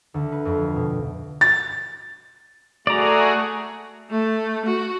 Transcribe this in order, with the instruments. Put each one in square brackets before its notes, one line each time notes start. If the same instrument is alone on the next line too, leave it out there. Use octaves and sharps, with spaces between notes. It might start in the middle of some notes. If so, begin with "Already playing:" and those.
[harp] D2
B4
F2
B2
[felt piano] A6
[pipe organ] A3 F#4 G#4 [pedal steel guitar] D5 A#5
[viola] A3
F#4